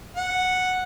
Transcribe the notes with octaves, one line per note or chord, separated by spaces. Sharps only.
F#5